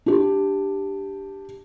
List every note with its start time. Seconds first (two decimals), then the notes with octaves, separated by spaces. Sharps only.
0.06 D4 G4